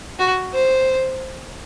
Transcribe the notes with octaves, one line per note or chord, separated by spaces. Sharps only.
F#4
C5